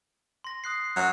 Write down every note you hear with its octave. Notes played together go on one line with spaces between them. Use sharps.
C6 A#6
D#6 F#6 C7
F#3